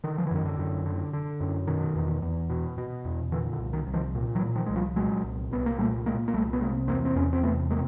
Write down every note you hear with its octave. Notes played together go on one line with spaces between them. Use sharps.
D3 D#3
F3
E3
F#2 D#3
D3
F#2
D3
D3
F#2
B2 D#3
E2
E2
B2
B2
E2
A#2 D3 E3
D3
C2
D#3
C2
D#3 F3
A#2
E3 F#3
A#2
D#3 F3
C2 G#3
F3 G3
A#2 F#3 G#3
C2
C2 B3
A#3
A#2 G3 A3
A#2 G#3 A#3
A#3
C2 G3 A3
B3
C3 G#3 A#3
E2 A#3 C4
C4
E2 B3 C#4
C4
C3 A3 B3
C3 G#3 A#3